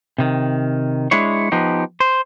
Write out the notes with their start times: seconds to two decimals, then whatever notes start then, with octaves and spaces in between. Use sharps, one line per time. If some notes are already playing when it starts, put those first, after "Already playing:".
0.18 C3 D#3
1.11 G#3 D4 E4 C#5
1.52 F3 B3 D#4 G4
2.00 C5